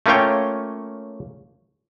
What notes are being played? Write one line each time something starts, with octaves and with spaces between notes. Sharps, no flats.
A3 A#3 C#4 F4 C#5 G5